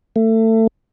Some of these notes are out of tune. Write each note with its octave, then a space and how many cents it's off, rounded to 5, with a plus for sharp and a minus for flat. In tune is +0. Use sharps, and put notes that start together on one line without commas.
A3 +25